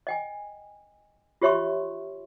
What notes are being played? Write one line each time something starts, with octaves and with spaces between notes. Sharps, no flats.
D#5 G5 G#5
F4 G4 C#5 E5 C6 C#6